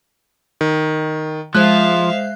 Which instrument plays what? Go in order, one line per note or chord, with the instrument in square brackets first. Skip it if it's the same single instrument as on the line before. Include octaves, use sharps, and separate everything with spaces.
[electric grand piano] D#3
[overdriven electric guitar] F3 [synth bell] G#3 C5 C7 [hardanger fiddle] E5 F5 [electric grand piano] F#6